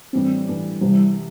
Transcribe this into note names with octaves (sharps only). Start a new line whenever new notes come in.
A2 E3 G3 C4 D4
A2 E3 G3 D4
C2 C3 E3 G3